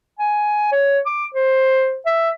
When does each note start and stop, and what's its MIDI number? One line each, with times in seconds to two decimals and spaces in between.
0.19 0.71 80
0.72 0.99 73
1.06 1.25 86
1.34 1.97 72
2.06 2.31 76